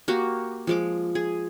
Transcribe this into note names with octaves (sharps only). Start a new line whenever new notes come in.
A#3 F#4 G4
F3 G#3 D6
G#4